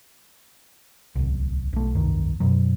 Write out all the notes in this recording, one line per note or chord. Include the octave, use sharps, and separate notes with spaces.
D1 C2
B1 A3
F1 C2 G2 D#3
F#2 B2 F#3